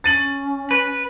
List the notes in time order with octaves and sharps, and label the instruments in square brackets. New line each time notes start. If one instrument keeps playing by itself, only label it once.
[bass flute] C#4 [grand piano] A6 D#7 F#7
[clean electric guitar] B4